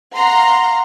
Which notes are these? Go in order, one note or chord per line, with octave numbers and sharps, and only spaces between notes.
F5 F#5 A#5 C6